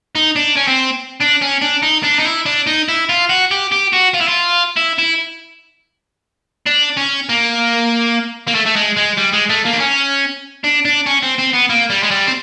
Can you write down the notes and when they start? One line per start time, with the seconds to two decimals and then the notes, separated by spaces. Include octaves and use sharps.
0.15 D#4
0.36 D4
0.57 C#4
0.68 C4
1.20 D4
1.42 C#4
1.62 D4
1.83 D#4
2.04 D4
2.20 D#4
2.26 E4
2.46 D4
2.67 D#4
2.89 E4
3.09 F4
3.29 F#4
3.51 G4
3.72 G4
3.93 F#4
4.14 F4
4.21 E4
4.28 F4
4.77 E4
4.98 E4
6.66 D4
6.97 C#4
7.29 A#3
8.47 A#3
8.55 A3
8.66 A3
8.76 G#3
8.97 G#3
9.17 G3
9.33 G#3
9.49 A3
9.65 A#3
9.73 D4
9.80 C#4
10.64 D4
10.85 D4
11.06 C#4
11.22 C4
11.38 C4
11.53 B3
11.69 A#3
11.90 G3
12.03 G#3
12.11 G3
12.27 C4